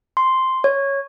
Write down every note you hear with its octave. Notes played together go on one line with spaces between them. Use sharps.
C6
C#5